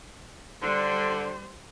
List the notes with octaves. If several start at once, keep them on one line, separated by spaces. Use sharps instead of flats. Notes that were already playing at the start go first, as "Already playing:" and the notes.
D3 G3 C5